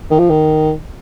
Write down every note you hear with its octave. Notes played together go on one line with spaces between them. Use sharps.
D#3
F3
D#3